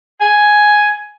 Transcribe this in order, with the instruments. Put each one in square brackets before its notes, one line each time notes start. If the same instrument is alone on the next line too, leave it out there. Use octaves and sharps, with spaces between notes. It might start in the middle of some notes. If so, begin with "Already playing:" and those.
[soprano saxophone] G#5